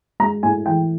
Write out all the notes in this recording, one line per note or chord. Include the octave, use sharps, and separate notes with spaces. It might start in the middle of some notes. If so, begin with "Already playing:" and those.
G#3 A#5
A2 G#5
E3 G5